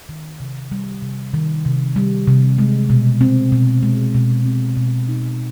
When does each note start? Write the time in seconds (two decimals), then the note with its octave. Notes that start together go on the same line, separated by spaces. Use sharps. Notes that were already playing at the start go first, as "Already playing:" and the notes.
0.09 D#3
0.40 C3
0.72 G3
1.02 C3
1.34 D#3
1.65 C3
1.96 G3
2.27 C3
2.58 G#3
2.90 B2
3.21 C4
3.52 B2
3.83 G#3
4.14 B2
4.45 C4
4.77 B2
5.08 D#4